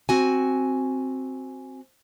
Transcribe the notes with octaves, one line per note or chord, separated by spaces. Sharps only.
C4 F#4 G#5